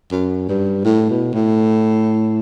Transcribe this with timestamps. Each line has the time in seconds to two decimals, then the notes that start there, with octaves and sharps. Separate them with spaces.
0.11 F#2
0.49 G2
0.84 A2
1.09 B2
1.33 A2